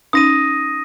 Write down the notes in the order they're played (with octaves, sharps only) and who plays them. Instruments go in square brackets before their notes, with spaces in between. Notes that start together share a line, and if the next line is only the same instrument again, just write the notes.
[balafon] C#4 D#4 [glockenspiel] D#6 A#6 D#7